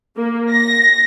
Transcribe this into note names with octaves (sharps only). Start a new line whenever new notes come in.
A#3
A#6